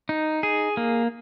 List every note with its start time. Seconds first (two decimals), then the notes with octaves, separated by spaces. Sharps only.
0.09 D#4
0.43 G#4
0.77 A#3